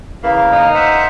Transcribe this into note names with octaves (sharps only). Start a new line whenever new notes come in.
C#3 E3 A#3 F5
D#4
C5 E5 F#5